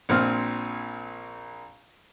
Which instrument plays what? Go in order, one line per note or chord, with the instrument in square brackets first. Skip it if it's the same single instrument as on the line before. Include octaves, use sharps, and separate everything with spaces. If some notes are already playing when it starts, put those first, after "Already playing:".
[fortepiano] A#1 A#2 C4 F6